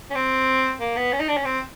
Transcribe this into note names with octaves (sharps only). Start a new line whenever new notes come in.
C#4
C4
A#3
B3
C#4
D#4
D4
C#4
C4